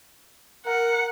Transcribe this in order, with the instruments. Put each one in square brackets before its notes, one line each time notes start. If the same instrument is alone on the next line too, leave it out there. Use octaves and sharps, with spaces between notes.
[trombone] A#4 [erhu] F#5